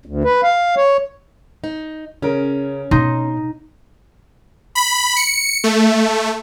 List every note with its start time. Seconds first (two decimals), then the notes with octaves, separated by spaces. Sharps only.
0.06 D2
0.24 B4
0.43 F5
0.77 C#5
1.64 D#4
2.22 C#3 C#4 A#4
2.91 B2 D#4 C6
4.75 B5
5.16 C#7
5.64 A3